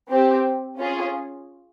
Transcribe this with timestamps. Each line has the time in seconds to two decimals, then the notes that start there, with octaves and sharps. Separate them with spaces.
0.09 C4 G4
0.78 C#4 F4 G#4